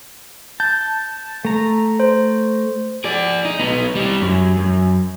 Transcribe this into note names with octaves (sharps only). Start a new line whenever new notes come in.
A5 G6
A3 A#5
C5
G#4 D5
D#4
B3 D#4
G3 C4
F#2
F#2